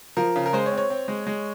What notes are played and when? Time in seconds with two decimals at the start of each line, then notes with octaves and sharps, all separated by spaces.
0.17 F3 A#4
0.36 C#3
0.46 A#4
0.53 G#3 C5
0.66 C#5
0.72 C4
0.78 C#5
0.90 C4
1.08 G#3
1.27 G#3